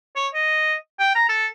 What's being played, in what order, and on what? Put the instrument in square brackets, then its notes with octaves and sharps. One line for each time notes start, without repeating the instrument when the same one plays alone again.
[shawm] C#5
D#5
G5
A#5
A4